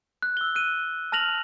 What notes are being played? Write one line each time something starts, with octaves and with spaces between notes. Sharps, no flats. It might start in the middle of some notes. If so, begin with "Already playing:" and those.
F#6
E6 G7
F#6 D#7
A5 F6 A#6 F7 F#7